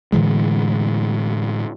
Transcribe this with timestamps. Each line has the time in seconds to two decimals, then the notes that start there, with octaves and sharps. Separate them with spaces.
0.12 A2 D3 E3 G#3